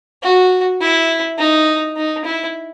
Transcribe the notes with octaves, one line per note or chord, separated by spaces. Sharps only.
F#4
E4
D#4
D#4
E4